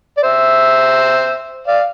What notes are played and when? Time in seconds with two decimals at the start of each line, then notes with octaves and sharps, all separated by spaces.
0.18 D5
0.23 C5 E5
1.67 D5 F5